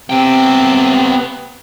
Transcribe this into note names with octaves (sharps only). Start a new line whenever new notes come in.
C3 B3 G5